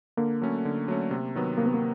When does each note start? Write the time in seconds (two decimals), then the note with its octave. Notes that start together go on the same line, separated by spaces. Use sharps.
0.17 D3 A#3
0.42 F#3 A3 C#4
0.65 D3
0.88 F#3 A3 C#4
1.11 C3
1.35 D#3 F#3 B3
1.58 C3 A#3
1.66 B3
1.74 A#3